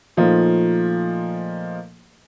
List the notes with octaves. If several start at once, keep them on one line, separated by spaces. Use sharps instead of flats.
A#2 F3 A3 D#4 F4